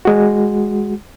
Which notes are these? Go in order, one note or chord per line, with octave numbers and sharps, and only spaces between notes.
G#3 F#4